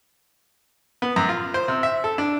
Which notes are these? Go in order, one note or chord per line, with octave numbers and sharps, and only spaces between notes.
B3
F#2
F4
C5
C3
E5
A4
D4